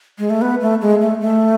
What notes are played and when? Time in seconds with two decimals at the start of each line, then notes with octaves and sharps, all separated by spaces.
0.19 G#3
0.30 A3
0.42 B3
0.61 A3
0.81 G#3
1.01 A3
1.21 A3